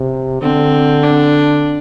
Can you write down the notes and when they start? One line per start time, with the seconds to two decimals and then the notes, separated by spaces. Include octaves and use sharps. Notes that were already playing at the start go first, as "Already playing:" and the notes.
Already playing: C3
0.42 D3 C4
1.03 D4